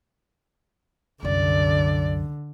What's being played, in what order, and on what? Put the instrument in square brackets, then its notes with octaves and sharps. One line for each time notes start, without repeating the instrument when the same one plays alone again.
[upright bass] C2 F#2 [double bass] D3 [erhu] D5